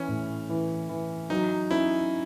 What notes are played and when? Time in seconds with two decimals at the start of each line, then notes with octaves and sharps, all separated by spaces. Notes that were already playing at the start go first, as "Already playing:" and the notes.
Already playing: E3 C#4
0.08 A2
0.49 E3
0.89 E3
1.30 F#3 D#4
1.71 C#4 E4